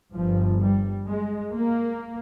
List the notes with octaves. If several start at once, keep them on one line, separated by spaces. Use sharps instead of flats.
G1 G2 F3
G3
G#3
A#3